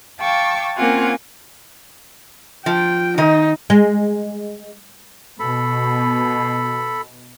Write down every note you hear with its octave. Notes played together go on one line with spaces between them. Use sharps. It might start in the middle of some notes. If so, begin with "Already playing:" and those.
F5 G5 A5 C#6 D6 E6
A#3 C4 C#4 F4 F#5 G#5
F3 G5
D#3 D#4 D#5
G#3
B2 A4 B5